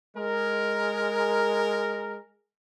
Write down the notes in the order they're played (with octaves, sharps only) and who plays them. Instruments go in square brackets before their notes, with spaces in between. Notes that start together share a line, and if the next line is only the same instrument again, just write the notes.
[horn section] G#3 A#4